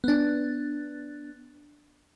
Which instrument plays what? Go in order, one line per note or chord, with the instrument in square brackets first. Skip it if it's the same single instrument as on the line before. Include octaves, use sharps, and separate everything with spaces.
[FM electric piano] B3 D4